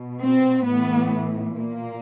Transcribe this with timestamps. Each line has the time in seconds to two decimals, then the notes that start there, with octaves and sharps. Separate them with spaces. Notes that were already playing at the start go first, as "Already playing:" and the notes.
Already playing: B2
0.20 C4
0.65 A2 E3 B3
1.55 A#2 A#3